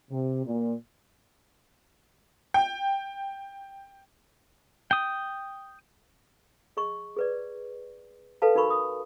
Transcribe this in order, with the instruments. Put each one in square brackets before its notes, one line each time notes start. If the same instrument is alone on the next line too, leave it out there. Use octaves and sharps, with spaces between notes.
[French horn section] C3
A#2
[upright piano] G5
[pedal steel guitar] G5 D#6
[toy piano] G#4 D#5 C#6
G#4 B4 D5
A4 B4 F5 A5
D#4 F#4 A#4 B5 C#6
D#6